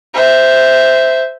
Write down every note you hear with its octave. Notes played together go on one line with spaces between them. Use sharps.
C5 E5